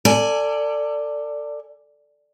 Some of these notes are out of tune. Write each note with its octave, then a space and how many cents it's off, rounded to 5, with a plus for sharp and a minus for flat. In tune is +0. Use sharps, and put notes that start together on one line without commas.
A4 +30 D5 +0 G#5 +5